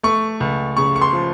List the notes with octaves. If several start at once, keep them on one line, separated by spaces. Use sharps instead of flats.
A3 C#6
C#2
C#3 C#6
C#6
C6
F3